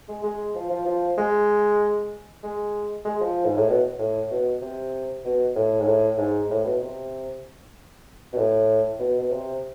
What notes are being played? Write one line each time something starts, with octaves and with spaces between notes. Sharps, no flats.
G#3
G#3
F3
F3
F3
G#3
G#3
G#3
F3
G#2
A2
B2
A2
B2
C3
B2
A2
G#2
A2
G#2
A2
B2
C3
B2
A2
B2
B2
C3